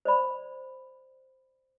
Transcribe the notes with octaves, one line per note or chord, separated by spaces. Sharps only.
C5 D5 B5